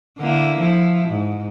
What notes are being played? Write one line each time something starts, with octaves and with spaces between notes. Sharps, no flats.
D3 A#3 E4
F3 E4
G#2